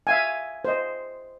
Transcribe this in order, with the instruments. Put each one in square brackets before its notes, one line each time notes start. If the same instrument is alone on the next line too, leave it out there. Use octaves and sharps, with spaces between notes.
[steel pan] E5 F5 G#5
C5 D#5